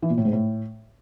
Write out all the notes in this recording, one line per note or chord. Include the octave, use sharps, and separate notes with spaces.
E3
A#2
A2
G#2
A2